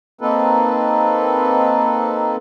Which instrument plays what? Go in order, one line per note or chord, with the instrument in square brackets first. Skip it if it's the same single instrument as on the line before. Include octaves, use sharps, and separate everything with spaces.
[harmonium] A#3 C4 D#4 A4 B4